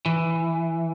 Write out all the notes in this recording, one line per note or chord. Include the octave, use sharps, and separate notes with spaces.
E3